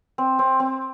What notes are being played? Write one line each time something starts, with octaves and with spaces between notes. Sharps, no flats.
C4
C4
C4